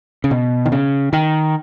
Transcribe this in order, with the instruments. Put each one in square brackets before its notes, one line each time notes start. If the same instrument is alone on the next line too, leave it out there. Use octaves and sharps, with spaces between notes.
[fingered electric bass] C#3
B2
D#3
C#3
D#3